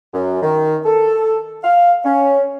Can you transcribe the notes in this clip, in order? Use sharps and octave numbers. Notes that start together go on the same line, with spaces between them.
F#2
D#3
A4
F5
C#4